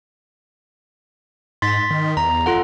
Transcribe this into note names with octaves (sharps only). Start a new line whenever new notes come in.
G#2 C6 A6 B6
D#3
E2 A#5
F2 F4 A4 F#5